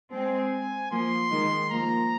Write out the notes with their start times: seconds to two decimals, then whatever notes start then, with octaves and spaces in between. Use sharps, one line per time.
0.13 G#3 C4 G#5
0.91 F3 A#3 C6
1.31 D#3 G#3
1.69 F3 A#3 A#5